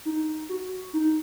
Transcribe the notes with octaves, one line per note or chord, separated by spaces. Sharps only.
D#4
F#4
D#4